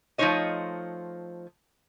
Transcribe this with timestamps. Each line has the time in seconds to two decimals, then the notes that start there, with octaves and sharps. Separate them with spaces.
0.18 F3 A3 D#4 C5 C#5 D#5